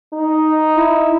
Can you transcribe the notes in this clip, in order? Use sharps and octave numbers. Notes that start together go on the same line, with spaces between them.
D#4
E4